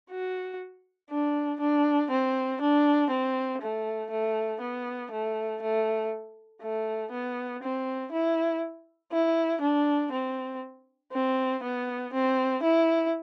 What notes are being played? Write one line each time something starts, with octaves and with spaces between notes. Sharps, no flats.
F#4
D4
D4
C4
D4
C4
A3
A3
B3
A3
A3
A3
B3
C4
E4
E4
D4
C4
C4
B3
C4
E4